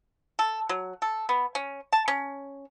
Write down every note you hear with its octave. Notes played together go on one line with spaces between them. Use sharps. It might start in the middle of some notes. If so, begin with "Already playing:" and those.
A4
F#3
A4
B3
C#4
A5
C#4